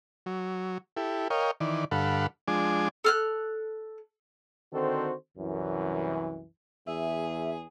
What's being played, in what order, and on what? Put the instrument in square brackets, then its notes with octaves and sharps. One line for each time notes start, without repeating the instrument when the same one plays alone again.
[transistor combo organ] F#3
E4 G4 A4
A#4 C#5 D#5 F5 G5
D#3 E3 D5
G2 D3 A4 F5 F#5 B5
F3 G#3 D4 G#5 D6
[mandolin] A4 F6 F#6
[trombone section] D3 D#3 C4 F#4 A4 C5
C2 F#2 E3
[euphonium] E2 [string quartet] G#4 [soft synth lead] E5